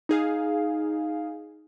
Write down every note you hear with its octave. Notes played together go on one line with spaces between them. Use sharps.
D#4 G#4 F5